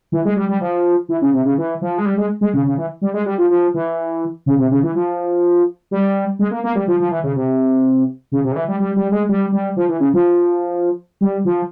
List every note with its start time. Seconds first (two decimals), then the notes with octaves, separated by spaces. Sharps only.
0.12 E3
0.25 G#3
0.37 G3
0.49 G3
0.61 F3
1.09 E3
1.22 C#3
1.33 C3
1.45 C#3
1.58 E3
1.81 F3
1.98 G#3
2.06 G3
2.18 G#3
2.41 G#3
2.54 C#3
2.66 C#3
2.78 E3
3.01 G3
3.14 G#3
3.26 G3
3.38 F3
3.50 F3
3.74 E3
4.46 C#3
4.58 C3
4.71 C#3
4.83 E3
4.95 F3
5.91 G3
6.39 G#3
6.51 A#3
6.64 A#3
6.75 G3
6.88 F3
7.00 F3
7.11 E3
7.24 C#3
7.36 C3
8.32 C#3
8.44 C3
8.52 C#3
8.56 E3
8.68 G3
8.80 G3
8.96 G3
9.12 G#3
9.29 G3
9.52 G3
9.76 F3
9.89 E3
10.00 C#3
10.13 F3
11.21 G3
11.45 F3